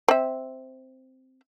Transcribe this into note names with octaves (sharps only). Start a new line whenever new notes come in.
C4 E5